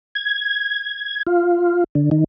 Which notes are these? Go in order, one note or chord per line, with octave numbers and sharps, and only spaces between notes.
G#6
F4
D3
D#3